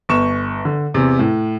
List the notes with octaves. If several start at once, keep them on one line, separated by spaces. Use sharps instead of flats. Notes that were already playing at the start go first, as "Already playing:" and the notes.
G1 C#6 E7
D3
E2 C3
A2